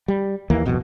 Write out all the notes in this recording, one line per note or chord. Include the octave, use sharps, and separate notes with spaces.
G3
D#2 E3 A#3
D1 F2 B2